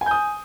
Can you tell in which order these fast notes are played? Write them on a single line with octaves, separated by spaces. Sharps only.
G#5 G6 D#6